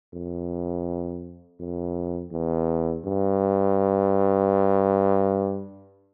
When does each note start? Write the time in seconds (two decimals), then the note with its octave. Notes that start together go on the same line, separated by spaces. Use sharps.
0.14 F2
1.60 F2
2.32 E2
3.05 G2